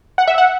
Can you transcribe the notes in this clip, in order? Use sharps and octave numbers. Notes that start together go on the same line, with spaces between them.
F#5
E5
F#5